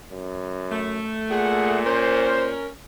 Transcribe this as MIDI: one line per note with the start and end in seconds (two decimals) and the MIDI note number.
0.12 1.03 42
0.71 1.80 57
1.30 2.57 46
1.30 1.77 68
1.30 1.77 78
1.85 2.67 61
1.85 2.67 70
1.85 2.47 72